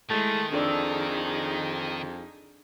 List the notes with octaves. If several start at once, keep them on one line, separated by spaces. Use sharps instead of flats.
D#3 G#3 A3 E4
F2 D4 D#4 G#4 A4 D5